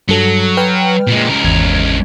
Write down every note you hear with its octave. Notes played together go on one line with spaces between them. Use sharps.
G2 F#3 A4
B4 G5 F6
A#2 G#3
C#2 A#4
G#1 E2 G#6